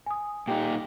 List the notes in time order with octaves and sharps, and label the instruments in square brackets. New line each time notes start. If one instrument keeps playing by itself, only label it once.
[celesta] G#5 D#6
[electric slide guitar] A#2 D#4 [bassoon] G4